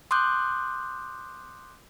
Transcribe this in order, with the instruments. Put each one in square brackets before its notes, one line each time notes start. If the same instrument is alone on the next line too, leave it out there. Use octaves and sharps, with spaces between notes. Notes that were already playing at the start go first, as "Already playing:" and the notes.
[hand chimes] C6 D6 D#6 F#6 G6